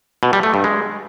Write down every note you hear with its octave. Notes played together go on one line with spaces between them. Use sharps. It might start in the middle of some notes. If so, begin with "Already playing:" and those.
B2
G3
A3
G2
G#3